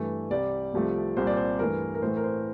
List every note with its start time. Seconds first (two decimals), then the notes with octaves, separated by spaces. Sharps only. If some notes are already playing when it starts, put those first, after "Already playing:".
Already playing: G2 E3 A3
0.30 C2 C3 G3 D5
0.74 C2 C3 F3 A3
1.17 C2 A#2 G3 C5
1.27 D5
1.37 C5
1.59 G2 E3 A3 A#4
1.95 A#4
2.02 A2 E3 A3 C5
2.17 A#4
2.24 C5